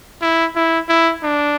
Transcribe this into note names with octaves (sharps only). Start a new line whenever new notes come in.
E4
E4
E4
D4